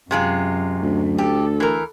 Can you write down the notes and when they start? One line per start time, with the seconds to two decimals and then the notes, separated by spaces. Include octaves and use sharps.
0.11 F#2 C3 G#3 F4
0.83 D2
1.18 G4 A4
1.60 E3 A#4